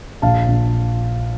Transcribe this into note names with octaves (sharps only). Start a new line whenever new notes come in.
A#1 F5 A5
A#1